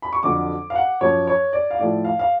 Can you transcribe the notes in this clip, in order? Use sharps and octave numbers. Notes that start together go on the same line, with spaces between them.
B5
C#6
F2 D3 F#3 D6
F5
F#5
F#2 F3 C#5
C#5
D5
F5
A2 F3 D5
F5
F5